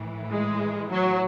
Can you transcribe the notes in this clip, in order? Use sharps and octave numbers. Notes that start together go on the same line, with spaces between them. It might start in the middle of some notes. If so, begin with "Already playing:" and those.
Already playing: A2 E3
G#3
F#3